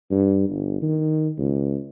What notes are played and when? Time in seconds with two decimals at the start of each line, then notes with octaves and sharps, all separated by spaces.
0.11 G2
0.49 G1
0.82 D#3
1.38 C#2